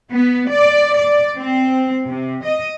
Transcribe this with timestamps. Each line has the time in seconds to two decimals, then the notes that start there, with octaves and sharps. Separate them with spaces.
0.12 B3
0.51 D5
0.96 D5
1.36 C4
2.07 C3
2.45 D#5